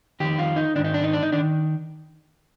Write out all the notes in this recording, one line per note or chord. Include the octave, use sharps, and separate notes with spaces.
F2 D#3 G4
F4
D#4
G#2 D#3 D4
D#4
D4
D#4
D4
D#4
D#3 D4